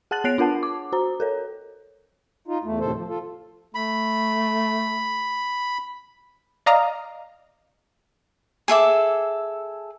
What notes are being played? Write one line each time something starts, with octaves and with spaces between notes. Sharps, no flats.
G#4 F#5 A5 F#6 A6 F#7
B3 C#5 F#6 C7 D7 F7
D4 F4 A#4 F#5 A5
D6
F#4 C5 A#5
A4 A#4 C#5
D#4 F4
E2 A3
D2 A2 C3 D#3 A4 C5
F3
F4 A4
A3 B5
D5 D#5 F5 A#5 D#6 F6
G#4 A4 E5 D6